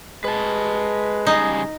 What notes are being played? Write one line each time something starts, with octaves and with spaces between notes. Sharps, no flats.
G#3 B4 A5
C#3 G3 D#4 G#4